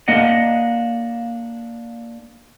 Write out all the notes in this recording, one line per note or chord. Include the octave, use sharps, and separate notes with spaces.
A#3 D4 D#5 F#5